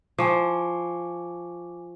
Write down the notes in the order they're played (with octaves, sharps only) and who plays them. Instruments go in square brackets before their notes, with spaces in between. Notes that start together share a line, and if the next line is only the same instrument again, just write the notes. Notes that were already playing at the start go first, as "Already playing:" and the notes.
[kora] F3 [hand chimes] G#5 C#6 D6